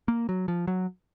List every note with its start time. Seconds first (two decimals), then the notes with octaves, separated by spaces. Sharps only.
0.08 A#3
0.29 F#3
0.48 F3
0.67 F#3